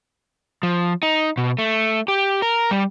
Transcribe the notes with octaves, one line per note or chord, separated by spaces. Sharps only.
F3
D#4
B2
A3
G4
A#4
G3